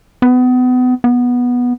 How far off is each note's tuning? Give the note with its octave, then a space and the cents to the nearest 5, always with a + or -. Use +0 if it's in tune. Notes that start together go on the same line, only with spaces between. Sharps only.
B3 +30
B3 -10